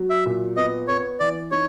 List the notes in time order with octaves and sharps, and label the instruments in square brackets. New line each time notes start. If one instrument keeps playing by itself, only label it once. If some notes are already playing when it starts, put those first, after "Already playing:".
Already playing: [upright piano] F#3
[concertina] E5
[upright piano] A#2
[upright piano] B3 [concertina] D#5
[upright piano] B3 [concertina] C#5
[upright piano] E3 [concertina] D5
[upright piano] D#4 [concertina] C#5